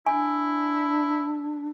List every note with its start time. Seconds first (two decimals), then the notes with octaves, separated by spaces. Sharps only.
0.06 D4 E4 G#5